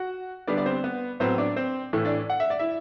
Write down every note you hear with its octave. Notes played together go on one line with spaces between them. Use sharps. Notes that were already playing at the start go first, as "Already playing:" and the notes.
Already playing: F#4 F#5
D3 G3 B3 D4 D5
D5
C4 C5
B3 B4
A2 F#3 B3 C4 C5
D4 D5
C4 C5
A2 E3 A3
D4 D5
F#5
E5
D5
E4 E5